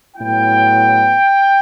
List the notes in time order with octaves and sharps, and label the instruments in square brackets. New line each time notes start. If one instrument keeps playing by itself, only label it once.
[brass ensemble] A2 F#3 B3 E4 G5